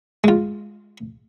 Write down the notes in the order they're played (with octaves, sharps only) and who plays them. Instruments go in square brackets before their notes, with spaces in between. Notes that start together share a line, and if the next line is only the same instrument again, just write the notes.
[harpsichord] G#3 F4